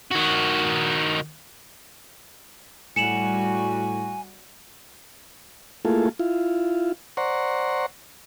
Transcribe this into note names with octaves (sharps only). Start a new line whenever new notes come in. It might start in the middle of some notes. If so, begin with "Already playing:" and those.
D#3 F#4
A2 G3 F#4 G#5 C#7 E7 F#7
A3 A#3 E4 F4 G#4 A4
E4 F4
C5 D5 F#5 A#5 C6 C#6